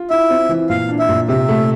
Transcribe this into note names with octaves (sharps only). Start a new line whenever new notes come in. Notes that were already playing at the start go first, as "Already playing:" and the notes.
Already playing: F4
E4 E5
C4
E3
A#2 F5
D4
E5
A#2
C3 E5
A3